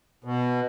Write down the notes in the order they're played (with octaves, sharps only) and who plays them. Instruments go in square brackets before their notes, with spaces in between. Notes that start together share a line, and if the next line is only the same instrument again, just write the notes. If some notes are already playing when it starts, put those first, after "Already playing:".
[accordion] B2